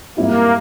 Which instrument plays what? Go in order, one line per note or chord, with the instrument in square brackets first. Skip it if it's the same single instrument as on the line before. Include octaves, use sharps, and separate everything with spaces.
[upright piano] G#2 G3 C4 E4 G4 [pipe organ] A#3